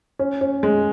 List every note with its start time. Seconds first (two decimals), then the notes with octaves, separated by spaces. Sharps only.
0.19 C#4
0.41 C#4
0.63 G#3